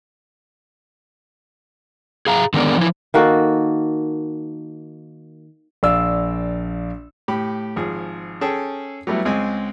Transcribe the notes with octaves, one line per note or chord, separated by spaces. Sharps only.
G#4 F5 A#5
D3 D#3 G#3 B3 A#4 D5
F3 E4
D#3 A#3 F#4 A4
A#1 D5 F5 E6
A2 G4 B5
G#1 F3 G#4
C#4 G#4 A4 G5 A5
F#3 G3 A3 B3 E4
C#2 G#3 C4 D#5 G#5